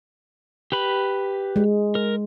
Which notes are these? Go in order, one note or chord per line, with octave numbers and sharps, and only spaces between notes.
G4 B4 B5
G#3
A#4